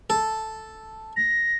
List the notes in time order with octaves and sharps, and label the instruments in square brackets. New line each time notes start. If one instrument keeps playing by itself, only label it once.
[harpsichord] A4
[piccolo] A#6